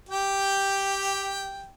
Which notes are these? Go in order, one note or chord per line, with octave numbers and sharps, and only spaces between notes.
G4 G5